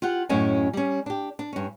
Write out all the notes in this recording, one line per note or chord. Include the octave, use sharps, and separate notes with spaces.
F4 G4 F#5
F#2 A2 C#4 D#5 G#5
G3 C#4
D4 G4
D4
G2 C#4